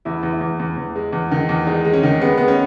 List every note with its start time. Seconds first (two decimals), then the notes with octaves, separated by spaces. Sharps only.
0.05 E2 E4
0.23 E2
0.33 E4
0.41 E2
0.60 E2
0.77 E2
0.96 G#3
1.13 E2
1.31 D#3
1.49 E2
1.66 G#3 D#4
1.85 G#3
1.93 C#4
2.03 D#3
2.21 G#3 B3
2.38 G#3 B3
2.48 C#4